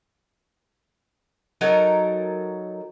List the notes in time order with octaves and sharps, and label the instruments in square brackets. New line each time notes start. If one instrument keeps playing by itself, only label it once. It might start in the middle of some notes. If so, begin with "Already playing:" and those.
[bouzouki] F#3 D#4 A4 A#4